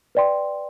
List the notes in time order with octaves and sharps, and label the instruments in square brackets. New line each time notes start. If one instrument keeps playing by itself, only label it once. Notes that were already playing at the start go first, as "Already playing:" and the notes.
[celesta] B4 D5 G5 C6